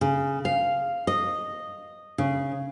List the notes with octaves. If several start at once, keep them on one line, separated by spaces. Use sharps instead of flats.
C#3
F5
D#5
C#3